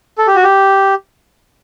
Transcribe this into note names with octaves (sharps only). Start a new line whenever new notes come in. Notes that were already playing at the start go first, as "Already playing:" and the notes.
A4
G4
F#4
G4